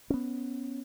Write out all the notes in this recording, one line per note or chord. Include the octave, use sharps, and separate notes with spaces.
B3 C#4